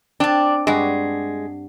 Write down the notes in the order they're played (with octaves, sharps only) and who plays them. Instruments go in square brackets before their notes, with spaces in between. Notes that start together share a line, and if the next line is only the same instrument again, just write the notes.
[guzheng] C4 A5 [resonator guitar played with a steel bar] D4
[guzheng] G2 F#4 [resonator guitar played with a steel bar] G#3